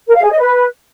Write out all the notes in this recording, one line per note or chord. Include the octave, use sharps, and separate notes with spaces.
A#4
F5
G#4
D#5
B4